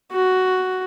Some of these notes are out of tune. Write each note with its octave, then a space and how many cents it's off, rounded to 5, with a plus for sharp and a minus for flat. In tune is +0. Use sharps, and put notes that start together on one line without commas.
F#4 +5